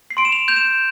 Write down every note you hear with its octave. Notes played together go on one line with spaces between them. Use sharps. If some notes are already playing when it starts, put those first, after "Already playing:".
C7
C6 D7
E7
F7
G6 F7
E7